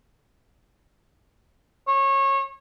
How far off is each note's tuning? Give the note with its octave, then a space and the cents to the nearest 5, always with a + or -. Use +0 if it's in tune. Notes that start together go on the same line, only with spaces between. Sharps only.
C#5 -25